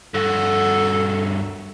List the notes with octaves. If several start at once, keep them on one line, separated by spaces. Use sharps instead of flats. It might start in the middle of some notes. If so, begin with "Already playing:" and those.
G2 F#4 A4